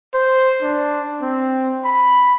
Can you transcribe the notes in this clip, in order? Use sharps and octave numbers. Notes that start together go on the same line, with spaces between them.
C5
D4
C4
B5